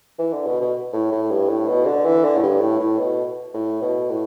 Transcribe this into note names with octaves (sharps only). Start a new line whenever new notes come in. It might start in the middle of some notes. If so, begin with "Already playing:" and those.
E3
D3
B2
B2
A2
A2
G2
A2
B2
D3
E3
D3
A2
G2
A2
A2
B2
A2
B2
A2